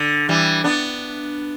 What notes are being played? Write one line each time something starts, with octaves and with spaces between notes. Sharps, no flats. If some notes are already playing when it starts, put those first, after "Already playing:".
Already playing: D3
E3 G3
B3 D4